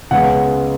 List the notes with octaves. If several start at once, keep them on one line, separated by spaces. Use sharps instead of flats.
C#2 C#3 G#3 B3 F#5